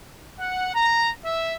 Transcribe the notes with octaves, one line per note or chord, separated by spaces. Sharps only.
F#5
A#5
E5